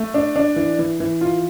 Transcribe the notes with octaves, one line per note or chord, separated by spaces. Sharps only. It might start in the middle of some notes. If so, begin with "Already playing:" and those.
Already playing: A3
D4
D4
E3
E3
E3
F4